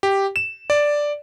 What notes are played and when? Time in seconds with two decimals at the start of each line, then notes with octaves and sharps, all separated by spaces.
0.03 G4
0.36 E7
0.70 D5